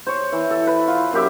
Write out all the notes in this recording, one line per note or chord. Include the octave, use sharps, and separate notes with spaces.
C5 C#5
E3
A4
B4
F4
F#2 G4 E5